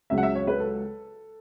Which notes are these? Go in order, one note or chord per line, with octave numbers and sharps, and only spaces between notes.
C#2 C#3 F#3 E5
F#5
E5
C#5
B4
A4